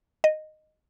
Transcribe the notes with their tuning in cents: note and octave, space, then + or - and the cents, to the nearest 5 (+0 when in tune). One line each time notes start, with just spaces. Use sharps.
D#5 -10